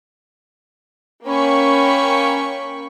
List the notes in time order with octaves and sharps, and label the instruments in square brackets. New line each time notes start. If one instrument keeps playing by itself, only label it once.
[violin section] A#3 C#4 G5 B5 C#6